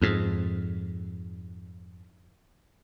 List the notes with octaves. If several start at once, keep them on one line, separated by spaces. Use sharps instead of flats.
F2 G#2